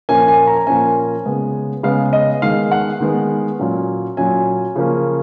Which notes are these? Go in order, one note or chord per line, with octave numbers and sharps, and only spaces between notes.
A#2 F3 A#3 C#4 G#5
G#5
A#5
A#2 F3 A#3 C#4 G#5
C#3 G#3 B3
C#3 G#3 B3 F5
D#5
D#3 G#3 B3 F5
F#5
D#3 G#3 B3
A#2 F#3 C#4
A#2 F#3 C#4 G#5
C#3 F3 A#3 C#4